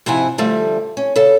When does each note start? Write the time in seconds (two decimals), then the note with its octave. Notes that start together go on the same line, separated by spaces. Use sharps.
0.06 G#2 C3 F3 E4 F#5 G#5
0.38 D3 F3 G3 A3
0.97 C#4
1.16 C#3 A4